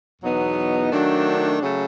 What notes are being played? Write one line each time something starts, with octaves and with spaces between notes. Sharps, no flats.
E2 B2 F#3 B3 D#4
D#3 F#3 A3 D4
C#3 F#3 A3